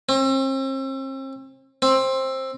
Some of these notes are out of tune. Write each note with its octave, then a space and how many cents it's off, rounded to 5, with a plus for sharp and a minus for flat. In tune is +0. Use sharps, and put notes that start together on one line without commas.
C4 +40
C4 +15